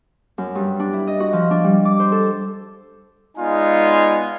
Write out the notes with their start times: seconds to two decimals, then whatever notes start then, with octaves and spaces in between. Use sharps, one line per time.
0.38 F#2
0.55 G2
0.80 D4
0.93 E4
1.07 D#5
1.20 F#4
1.33 F3
1.51 D4
1.64 G3
1.85 D6
1.99 C5
2.12 A4
3.38 G#3 B3 D#4 F4 D5 G#5